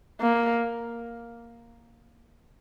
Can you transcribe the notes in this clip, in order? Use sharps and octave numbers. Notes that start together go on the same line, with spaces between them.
A#3